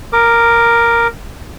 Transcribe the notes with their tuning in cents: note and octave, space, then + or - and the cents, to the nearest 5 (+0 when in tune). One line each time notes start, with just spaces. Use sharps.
A#4 +0 D6 +20